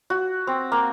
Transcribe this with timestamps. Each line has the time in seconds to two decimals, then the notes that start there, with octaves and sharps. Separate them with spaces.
0.10 F#4
0.47 C4
0.72 A#3